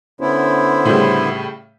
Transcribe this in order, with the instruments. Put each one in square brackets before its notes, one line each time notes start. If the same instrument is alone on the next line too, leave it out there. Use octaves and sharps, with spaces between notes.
[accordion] D3 B3 E4 [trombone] C#4 [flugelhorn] C5
[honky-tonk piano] A2 C#3 G3